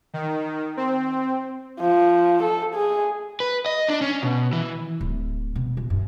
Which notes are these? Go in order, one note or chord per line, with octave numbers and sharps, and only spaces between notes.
D#3
C4
F3
A4
G#4
B4
D#5
D4
C#4
B2
E3
D1
B2
A#1
F#2